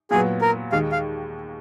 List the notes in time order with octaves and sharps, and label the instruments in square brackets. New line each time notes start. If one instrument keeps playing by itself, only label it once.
[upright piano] A#2 F#3 B3 [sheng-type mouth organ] G#4
[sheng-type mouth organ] A#4
[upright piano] D#2 D#3 G#3 [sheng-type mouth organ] F5
[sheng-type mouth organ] F5